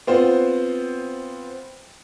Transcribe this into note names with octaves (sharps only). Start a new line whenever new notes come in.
B3 C4 F4 C5